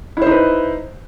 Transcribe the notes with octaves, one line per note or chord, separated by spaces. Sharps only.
D#4 E4 B4 C5